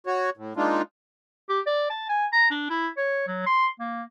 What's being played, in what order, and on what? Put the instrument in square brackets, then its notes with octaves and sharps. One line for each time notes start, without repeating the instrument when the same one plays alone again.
[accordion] F#4 C#5
A2
G#3 A#3 D4 D#4 F4
[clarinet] G4
D5
A5
G#5
A#5
D4
E4
C#5
F#3
C6
A#3